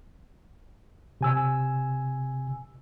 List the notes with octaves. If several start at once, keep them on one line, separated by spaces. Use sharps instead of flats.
C3 G#5 E6